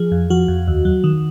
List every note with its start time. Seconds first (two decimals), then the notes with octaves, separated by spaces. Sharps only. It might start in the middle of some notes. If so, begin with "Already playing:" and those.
Already playing: F3 G#4
0.12 F2
0.30 F3 F#4
0.48 F2
0.68 D#2
0.85 F#3
1.04 D#3